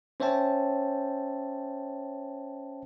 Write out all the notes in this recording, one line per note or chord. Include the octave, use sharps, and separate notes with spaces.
C#4 C5 C#5 E5 G5 A5